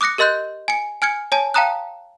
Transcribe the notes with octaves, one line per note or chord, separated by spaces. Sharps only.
D6 D#6 F#6 A#6 C#7
G4 A#4 D#5 C6 F#6 G6
G#5 C#7
G#5 F6 G#6 C#7
C#5 G#5 A5
F5 G5 A5 A#5 D#6 F#6